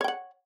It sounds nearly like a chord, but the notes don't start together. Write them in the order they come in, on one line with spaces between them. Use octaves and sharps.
C#5 G5 F#5